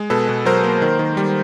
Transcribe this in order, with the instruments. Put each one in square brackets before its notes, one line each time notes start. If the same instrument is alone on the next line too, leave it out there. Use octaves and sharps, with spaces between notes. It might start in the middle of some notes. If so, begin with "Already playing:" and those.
Already playing: [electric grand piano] G#3
B2 A4 B4
B2
F#3 A#4 C5
A#3
D#3
D#3
G3